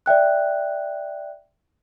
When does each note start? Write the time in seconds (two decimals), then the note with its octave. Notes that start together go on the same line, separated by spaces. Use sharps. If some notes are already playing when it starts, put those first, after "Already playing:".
0.06 D5 E5 G5 F#6